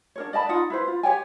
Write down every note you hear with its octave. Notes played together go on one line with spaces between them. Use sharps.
D4 A#4 C#5
D5 D#5 A5 B5
D#4 F4 F#5
E4 B4 C5
F4
G4 C#5 G5 G#5